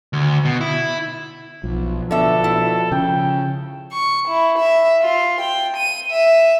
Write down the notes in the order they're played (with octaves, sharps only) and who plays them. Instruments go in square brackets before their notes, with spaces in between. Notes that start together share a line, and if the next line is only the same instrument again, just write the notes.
[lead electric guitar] D2
B2
E4
[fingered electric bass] B1 [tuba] F3
[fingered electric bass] B2 [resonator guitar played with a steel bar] D3 E5 [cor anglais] A4
[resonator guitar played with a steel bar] E4
[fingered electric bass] C#3 [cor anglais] G5
[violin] C#6
E4
E5
F4
G5
D#7
E5